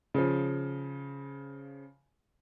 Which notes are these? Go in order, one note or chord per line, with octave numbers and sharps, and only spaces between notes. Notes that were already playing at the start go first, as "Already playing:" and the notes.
C#3 F3